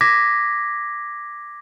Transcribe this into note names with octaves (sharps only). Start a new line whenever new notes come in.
D6 G#6 A#6 B6